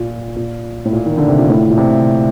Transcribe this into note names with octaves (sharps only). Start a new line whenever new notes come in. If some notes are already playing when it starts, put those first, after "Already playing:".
Already playing: A#2
A#2
A2
A#2
D#3
D3
C3
A#2
A2
A#2
C3